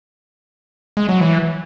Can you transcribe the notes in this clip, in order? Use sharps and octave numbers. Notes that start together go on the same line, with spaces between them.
G#3
F#3
E3